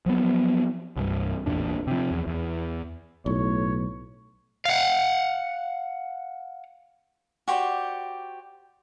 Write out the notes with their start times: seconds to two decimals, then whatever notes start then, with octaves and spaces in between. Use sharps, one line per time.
0.06 F3 F#3 B3
0.97 C2 G2
1.46 A1 E2 A#2 D4
1.87 C3 F3
2.11 E2
2.27 E2
3.26 B1 A2 C#5
4.65 F5 F#5
7.48 F#4 G4 C5 D5